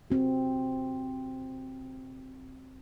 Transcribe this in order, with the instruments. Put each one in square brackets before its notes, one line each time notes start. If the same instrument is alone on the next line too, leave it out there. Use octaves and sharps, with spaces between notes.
[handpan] C4 F#4